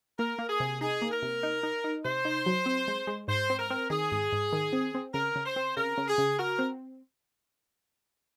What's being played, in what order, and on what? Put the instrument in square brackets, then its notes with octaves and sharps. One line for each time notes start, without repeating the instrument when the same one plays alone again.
[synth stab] A#3 [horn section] A#4
[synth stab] A#3
[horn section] G#4
[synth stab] C3
[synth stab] D#4 [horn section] G#4
[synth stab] A#3
[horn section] A#4
[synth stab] C3
D#4
D#4
D#4
[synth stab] C3 [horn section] C5
[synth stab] D#4
F#3
C4
G#3
G#3
[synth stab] G#2 [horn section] C5
[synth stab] C4
[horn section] A#4
[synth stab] C4
[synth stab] D#3 [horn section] G#4
[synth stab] G#2
G#2
D#3
C4
C4
[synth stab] C#3 [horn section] A#4
[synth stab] C#3
[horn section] C5
[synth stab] C4
[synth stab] C#3 [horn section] A#4
[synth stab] C#3
[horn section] G#4
[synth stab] C#3
[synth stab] F#4 [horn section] A#4
[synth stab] C4